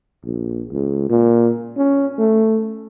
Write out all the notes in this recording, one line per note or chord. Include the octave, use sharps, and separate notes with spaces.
A#1
C#2
A#2
C#4
A3